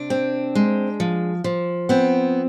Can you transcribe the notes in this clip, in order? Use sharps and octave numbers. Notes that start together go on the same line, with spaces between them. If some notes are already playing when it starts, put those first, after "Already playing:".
Already playing: C3 D4
C4
G#3
F3
F3
B3 C4